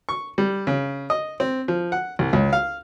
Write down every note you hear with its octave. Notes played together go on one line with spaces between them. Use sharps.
C#6
G3
C#3
D#5
C4
F3
F#5
C2
C#2
F5